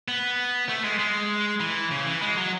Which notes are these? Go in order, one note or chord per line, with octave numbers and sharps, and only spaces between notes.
B3
A3
G#3
G#3
E3
C#3
E3
G#3
F#3